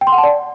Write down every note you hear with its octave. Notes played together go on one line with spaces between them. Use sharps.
G5
C6
F#5
A5
D5